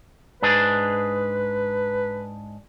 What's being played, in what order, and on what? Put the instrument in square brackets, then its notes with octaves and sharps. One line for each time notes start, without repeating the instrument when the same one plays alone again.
[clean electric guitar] G#2 D4 G#4 [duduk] B4